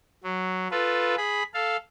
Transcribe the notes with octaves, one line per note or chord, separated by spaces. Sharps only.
F#3
F4 A4 B4
G#4 B5
A4 F5